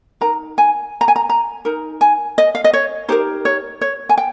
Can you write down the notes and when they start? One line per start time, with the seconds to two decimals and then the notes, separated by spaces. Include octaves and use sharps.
0.21 D#4 A#4 A#5
0.58 G#5
1.01 A#5
1.08 G#5
1.16 A#5
1.29 A#5
1.65 D#4 A#4
2.01 G#5
2.38 D#5
2.55 F5
2.64 D#5
2.73 C#5
3.08 D#4 G4 A#4 C5
3.45 C#5
3.81 C#5
4.09 G#5
4.18 G5